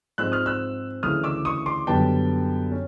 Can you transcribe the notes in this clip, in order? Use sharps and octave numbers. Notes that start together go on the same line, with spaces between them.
G#2 F3 G#3 C4 E6 F#6
D#6 F6
E6 F#6
D2 C#3 E3 D#6 F6
D6 E6
C#6 D#6
C6 D6
F#2 D3 G3 B3 G5 A5
C#4